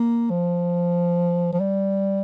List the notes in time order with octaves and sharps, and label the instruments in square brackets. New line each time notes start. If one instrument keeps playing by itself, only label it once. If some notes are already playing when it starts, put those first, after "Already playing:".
Already playing: [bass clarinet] A#3
F3
F3
G3